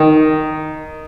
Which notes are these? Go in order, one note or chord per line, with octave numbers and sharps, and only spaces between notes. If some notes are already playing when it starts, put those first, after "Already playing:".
Already playing: D#3